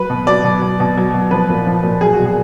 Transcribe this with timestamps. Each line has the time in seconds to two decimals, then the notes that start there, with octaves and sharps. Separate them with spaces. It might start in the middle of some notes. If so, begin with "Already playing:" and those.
Already playing: F#3 B4
0.10 B2
0.27 F#3 D5
0.44 B2
0.62 F#3
0.80 B2
0.97 F#3
1.14 B2
1.31 F3 B4
1.49 A#2
1.67 F3
1.84 A#2
2.01 F#3 G#4
2.13 F#4
2.19 B2
2.25 G#4